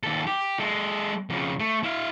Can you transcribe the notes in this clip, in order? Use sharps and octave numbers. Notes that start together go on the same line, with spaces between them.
D#2 A4
G4
G#3 A4
F2 C#3
A3
E4 F5